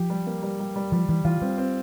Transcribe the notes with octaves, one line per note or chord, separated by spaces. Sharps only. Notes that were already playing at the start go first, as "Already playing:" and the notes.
Already playing: F3 G4
G3
A#3
G3
G3
G3
F3 G3
E3 G3
E3 F4
G3 C4
C4